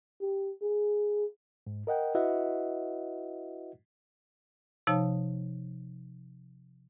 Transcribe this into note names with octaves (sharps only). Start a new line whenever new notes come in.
G4
G#4
G#2
A#4 D#5 F#5 G5
E4 F#4 B4 D#5 E5 F#5
C3 F3 D#4 C#5 F5 A5